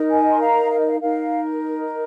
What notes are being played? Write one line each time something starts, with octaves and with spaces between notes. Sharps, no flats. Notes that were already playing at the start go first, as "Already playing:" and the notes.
Already playing: D#4 A#4
D#5 G#5
C6
F5 A#5
F5
D#5
F5
D#4 A#4 F5